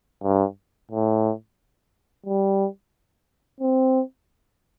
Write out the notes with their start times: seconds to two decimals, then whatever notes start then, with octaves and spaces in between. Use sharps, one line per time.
0.24 G2
0.91 A2
2.26 G3
3.61 C4